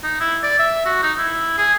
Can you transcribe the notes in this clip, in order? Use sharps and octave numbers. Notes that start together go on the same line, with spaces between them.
D#4
E4
D5
E5
F#4
D#4
E4
G#4